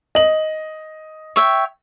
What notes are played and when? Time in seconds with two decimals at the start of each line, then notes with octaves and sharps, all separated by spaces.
0.15 D#5 F#7
1.36 C#5 E5 G5